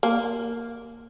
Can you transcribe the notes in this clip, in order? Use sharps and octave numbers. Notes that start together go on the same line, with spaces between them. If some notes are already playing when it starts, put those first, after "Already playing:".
A#3